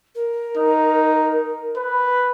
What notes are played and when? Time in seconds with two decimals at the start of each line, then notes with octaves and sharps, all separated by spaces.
0.15 A#4
0.57 D#4
1.77 B4